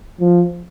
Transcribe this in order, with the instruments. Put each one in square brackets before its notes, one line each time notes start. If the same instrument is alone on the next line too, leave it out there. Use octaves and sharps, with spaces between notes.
[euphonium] F3